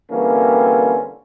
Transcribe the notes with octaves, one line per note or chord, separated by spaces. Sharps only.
D3 E3 G3 A#3 C4 C#4